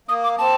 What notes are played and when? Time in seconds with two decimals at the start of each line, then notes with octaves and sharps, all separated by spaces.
0.08 A#3 D#6
0.24 D6
0.39 C4 A5